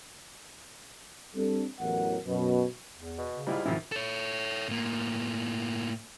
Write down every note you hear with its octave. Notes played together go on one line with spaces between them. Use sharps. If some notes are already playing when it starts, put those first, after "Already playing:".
G3 C4 D4 A4
A1 E2 F#3 A#4 F#5
F#2 B2
E2
B2
C#3
G#2 G3 E4 F4
G#2 C3 D#3 F3 E4
A4 C#5
A2 A#3